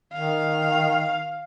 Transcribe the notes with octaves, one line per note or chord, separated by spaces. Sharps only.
D#3 F5